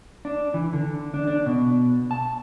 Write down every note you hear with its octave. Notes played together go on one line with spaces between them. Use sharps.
D4
E3
D3
D4
D4
B2
A5